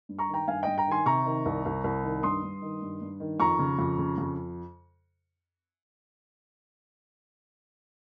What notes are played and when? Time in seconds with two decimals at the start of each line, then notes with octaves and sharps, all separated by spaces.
0.09 G2
0.19 A#5 C#6
0.28 D#3
0.34 G5 A#5
0.48 G2 F5 G#5
0.63 G2 D#5 G5
0.78 G5 A#5
0.87 D#3 G#5 C6
1.06 C3 A#5 C#6
1.26 D#3
1.45 C2
1.65 C2
1.84 C2
2.03 D#3
2.23 G2 C6 D#6
2.43 G2
2.62 D#3
2.82 G2
3.02 G2
3.20 D#3
3.40 F2 A#5 C#6
3.59 C#3
3.79 F2
3.98 C#3
4.18 F2